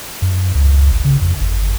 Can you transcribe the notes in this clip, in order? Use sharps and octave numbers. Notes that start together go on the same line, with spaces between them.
F#2
C#2
G1
C#3
F2
G1